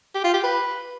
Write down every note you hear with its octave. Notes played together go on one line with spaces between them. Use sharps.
G4
F4
G4
B4